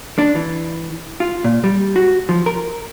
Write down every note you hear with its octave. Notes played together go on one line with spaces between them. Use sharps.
D4
E3
F4
A#2
G3
F#4
F3
A#4